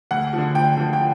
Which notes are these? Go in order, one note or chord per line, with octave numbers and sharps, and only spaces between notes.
D2 F#5
D3 F3
D2 G5
D3 F3
G5